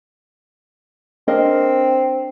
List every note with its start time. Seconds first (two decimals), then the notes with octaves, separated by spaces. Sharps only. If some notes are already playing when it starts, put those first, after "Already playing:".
1.28 C4 D4 A#4 D#5